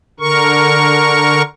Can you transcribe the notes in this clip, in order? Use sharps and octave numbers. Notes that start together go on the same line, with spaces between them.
D3 A#4 C#6